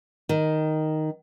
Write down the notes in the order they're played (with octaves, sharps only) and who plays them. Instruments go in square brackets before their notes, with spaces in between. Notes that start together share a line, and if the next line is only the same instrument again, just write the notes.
[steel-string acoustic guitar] D#3